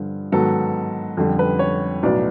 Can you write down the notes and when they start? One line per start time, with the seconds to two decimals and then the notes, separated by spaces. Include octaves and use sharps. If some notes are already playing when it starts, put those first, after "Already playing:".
Already playing: G2 D3 F3
0.32 G#2 D#3 F#3 B3 A4
1.17 F2 D3 G3
1.39 B4
1.59 C#5
2.03 B1 A2 F#3 B3 D5